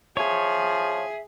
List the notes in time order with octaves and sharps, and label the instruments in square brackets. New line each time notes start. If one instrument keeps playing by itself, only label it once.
[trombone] F3 [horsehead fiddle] G#4 [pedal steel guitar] C#5 [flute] E5